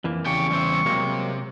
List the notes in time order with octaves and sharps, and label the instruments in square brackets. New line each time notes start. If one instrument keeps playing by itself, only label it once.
[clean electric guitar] F2 E3 A#3
[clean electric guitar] E2 C#3 [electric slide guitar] A3 G4 G5 [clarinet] C#6
[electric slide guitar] G3 C5 E5
[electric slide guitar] C3 [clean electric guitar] F#3 G#3 A#3